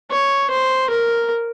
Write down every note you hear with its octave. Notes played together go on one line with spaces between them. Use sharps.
C#5
C5
A#4